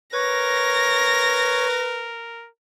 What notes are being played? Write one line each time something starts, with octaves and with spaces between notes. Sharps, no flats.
A#4 B4 C#5 A#6